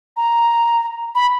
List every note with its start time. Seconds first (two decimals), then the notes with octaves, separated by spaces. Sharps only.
0.17 A#5
1.15 B5